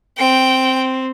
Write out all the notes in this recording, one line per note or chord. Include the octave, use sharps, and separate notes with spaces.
C4 G5